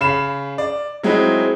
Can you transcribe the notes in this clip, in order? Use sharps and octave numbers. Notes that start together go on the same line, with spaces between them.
C#3 B5 E7
D5
F#3 G#3 C4 D#4 E4